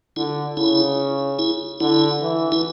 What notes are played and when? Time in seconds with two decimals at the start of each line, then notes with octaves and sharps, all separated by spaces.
0.16 D3 E4
0.57 C#3 E4
1.39 E4
1.80 D3 E4
2.21 E3
2.52 E4